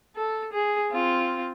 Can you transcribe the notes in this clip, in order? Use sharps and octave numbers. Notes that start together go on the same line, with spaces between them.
A4
G#4
C4 F4